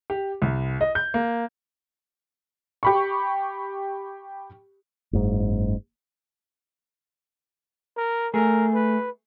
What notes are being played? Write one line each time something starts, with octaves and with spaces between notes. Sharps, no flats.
G4
C2
D#5
G6
A#3
G4 B5 C#6
F#1 G#2
A#4
A3 G#4 A#4
B4